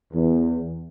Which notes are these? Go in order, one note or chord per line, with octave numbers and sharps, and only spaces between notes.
E2